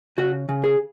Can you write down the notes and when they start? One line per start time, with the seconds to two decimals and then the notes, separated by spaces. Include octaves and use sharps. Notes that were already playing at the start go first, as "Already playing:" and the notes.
0.18 C#3 F#4
0.49 C#3
0.64 G#4